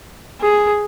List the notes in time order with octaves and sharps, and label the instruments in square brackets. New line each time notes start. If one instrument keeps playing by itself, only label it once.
[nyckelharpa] G#4